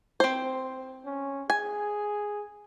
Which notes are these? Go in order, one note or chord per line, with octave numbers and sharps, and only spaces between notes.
C4 C5
C#4
G#4 G#5